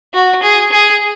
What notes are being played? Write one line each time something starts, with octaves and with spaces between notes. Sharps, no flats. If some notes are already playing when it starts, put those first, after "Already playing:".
F#4
G#4
G#4